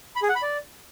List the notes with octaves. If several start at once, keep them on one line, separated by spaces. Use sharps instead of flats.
B5
G#4
F#5
B5
D5